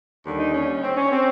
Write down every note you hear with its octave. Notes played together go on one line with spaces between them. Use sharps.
D#2 D3 G3
D#4
C#4
C4
C#4
C4